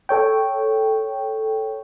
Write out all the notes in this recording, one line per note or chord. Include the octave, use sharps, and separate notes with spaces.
A4 C#5 G5